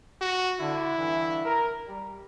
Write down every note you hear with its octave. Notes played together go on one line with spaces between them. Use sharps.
F#4
D3 E4
G2 D3 E3
A#4
G3